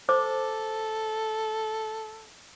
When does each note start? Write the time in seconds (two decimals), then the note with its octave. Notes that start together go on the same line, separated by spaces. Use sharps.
0.09 A4 C5 D6